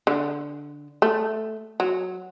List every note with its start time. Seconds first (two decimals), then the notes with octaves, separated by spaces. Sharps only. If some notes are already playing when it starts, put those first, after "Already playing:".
0.07 D3
1.02 A3
1.80 F#3